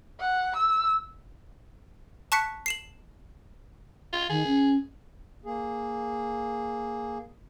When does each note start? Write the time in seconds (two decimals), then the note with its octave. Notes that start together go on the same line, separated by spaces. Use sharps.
0.20 F#5
0.56 E6
2.32 A5 C#6 F#6 B6 C#7
2.66 C7 E7 F#7
4.13 F4
4.30 D#3 G#4
4.47 C#4
5.45 A#3 G#4